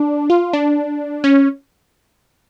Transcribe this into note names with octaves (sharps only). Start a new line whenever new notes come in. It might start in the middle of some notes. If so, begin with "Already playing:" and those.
Already playing: D4
F4
D4
C#4